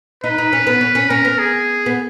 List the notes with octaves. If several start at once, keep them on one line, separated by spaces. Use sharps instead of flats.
D#4 B4
D#4
C#4
B3
C#4
C#4
C#4 A#4
B3
G#4
B3